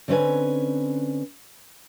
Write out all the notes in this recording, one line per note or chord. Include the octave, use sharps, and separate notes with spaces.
D3 C4 C#4 B4 G#5